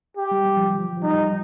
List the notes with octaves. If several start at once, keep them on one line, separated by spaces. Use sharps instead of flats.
G4
G3
G3
F3
D#3
F3
F3
G3 D#4